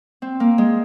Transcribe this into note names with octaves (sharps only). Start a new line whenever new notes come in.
C4
A#3
G#3